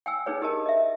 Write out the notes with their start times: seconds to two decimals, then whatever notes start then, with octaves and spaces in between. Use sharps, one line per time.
0.06 G5 G#5 E6
0.26 D4 D#4 G#4 B4 C#5
0.42 D#4 G4 G#4 A#4 D#5 A5
0.66 D#5 E5